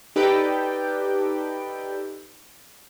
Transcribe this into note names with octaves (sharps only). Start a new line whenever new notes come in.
D#4 G4 A4 B4 D5 G5